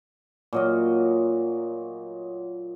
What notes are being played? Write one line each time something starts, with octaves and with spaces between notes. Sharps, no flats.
A#2 F#3 D#5